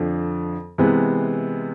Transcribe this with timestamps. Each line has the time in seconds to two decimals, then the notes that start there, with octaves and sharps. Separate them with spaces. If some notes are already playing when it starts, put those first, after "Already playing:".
Already playing: F2 D3 F3
0.78 C3 E3 G#3 B3